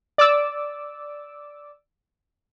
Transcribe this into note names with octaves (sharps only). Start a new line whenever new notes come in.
D5 D6 E6